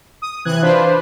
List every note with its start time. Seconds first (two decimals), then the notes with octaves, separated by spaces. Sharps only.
0.22 D#6
0.45 C3 E3 F#6 G#6
0.62 D4 F4 B4 C5